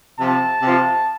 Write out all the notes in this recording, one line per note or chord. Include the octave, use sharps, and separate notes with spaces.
C3 F3 A5
C3 F3